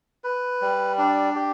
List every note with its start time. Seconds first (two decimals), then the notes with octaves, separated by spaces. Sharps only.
0.24 B4
0.62 G3
0.98 D4
1.36 G4